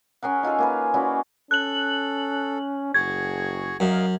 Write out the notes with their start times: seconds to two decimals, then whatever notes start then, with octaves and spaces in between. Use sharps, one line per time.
0.22 C#4 G#4 A#4 F#5
0.43 D#4 F4 G#4 A4
0.58 A#3 G#4 B4
0.94 C#4 E4 F#4 D5
1.51 C#4 A4 F#6 F#7
2.94 F#1 F#4 G#4 C#6 G#6
3.80 F#2 A#4 D#5 F5